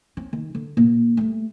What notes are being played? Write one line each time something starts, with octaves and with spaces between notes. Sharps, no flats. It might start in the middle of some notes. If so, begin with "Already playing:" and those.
C4 C#4
D#3
D3
A#2
G3 A3